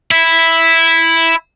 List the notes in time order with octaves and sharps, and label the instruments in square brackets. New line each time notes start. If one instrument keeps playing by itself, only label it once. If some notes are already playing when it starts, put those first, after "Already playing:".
[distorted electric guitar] E4